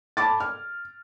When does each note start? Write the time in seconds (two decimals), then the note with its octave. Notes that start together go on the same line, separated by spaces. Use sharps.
0.17 A5 B5 D6 A6
0.40 F6